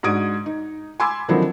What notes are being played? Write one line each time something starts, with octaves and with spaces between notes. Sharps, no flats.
G#2 D4 F#4 D#6 G#6 D7
D#4
G#5 B5 C6 D6 E6 G#6
D3 D#3 F3 F#3 C4 E4